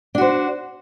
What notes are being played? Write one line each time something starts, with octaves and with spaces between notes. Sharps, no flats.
D4 F#4 C5